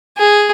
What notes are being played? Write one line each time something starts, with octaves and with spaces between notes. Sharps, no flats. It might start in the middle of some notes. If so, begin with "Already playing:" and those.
G#4